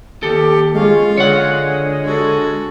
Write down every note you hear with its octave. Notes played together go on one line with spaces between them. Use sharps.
D#2 G4 A4
G#3 C#4 F4 F5
D3 G#3 C#5 F#5
F#4 A4